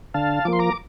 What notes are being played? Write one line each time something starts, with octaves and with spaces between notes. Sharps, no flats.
D3 F5 A5
F3 A#3 C6 D6
A#5 D6